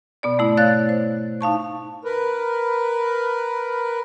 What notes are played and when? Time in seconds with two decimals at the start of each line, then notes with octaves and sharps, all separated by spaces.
0.23 B2 B3 D5
0.38 G#2 A3 E4
0.57 C#5 D5 F5 F#6 A6
0.89 C5
1.41 D#4 F5 A5 C#6
2.04 A#4 B4